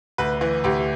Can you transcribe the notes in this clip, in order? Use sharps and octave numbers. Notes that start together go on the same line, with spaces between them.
D2 B4
E3
D2 G4